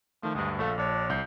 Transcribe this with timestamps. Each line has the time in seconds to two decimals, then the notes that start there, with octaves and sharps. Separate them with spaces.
0.23 D#3 F3 A3
0.35 D2 G2 G#3
0.59 A#1 A3 A4 F5
0.78 A#1 D4 C#5
1.10 C2 G6